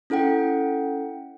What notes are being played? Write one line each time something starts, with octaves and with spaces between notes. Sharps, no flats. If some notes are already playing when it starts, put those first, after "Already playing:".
C#4 E4 A4 F#5 G5